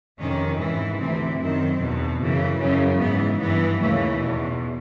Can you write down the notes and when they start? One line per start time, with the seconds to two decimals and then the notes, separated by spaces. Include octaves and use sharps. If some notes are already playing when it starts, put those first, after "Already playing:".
0.19 F2 C3 D#3 C#4
0.59 G#2 E3
1.00 D2 C3 E3 C4
1.40 F#2 D#3 C4
1.80 E2 B2
2.20 F#2 C#3 E3
2.61 F#2 C#3 E3 C#4
3.01 G#2 E3 B3
3.41 G2 E3 B3
3.81 D#2 C#3 E3 A3
4.22 E2 B2